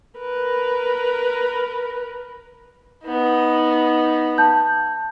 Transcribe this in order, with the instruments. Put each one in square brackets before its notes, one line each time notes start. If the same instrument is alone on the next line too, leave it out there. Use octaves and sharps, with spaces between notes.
[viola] A#4 B4
[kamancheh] B3 D#4
[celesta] A5 G6